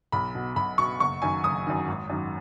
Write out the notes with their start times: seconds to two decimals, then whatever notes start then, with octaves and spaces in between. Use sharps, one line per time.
0.12 B1 B5
0.35 B2
0.56 B1 B5
0.78 B2 C#6
1.00 F#1 C#6
1.22 F#2 D#3 G#5
1.44 F#1 D#6
1.67 F#2 D#3
1.88 G#1
2.10 F#2 D#3